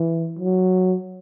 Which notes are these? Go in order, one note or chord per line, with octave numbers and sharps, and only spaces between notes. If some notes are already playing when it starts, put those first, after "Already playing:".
Already playing: E3
F#3